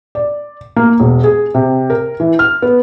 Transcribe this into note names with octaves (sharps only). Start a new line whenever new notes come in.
D5
A#3
E1
G#4
C3
A#4
E3
F6
B3